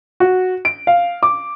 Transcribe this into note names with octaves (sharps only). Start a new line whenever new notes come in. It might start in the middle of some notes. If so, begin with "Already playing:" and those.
F#4
D7
F5
D6